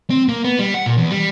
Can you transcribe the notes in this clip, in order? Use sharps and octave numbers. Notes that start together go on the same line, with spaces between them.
C4
A#3
B3
G3
F#5
A#2
E2
G3